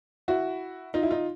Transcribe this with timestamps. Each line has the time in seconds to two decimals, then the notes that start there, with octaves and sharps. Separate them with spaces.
0.28 E4 F#4
0.94 D#4 F4
1.03 E4
1.10 D#4 F4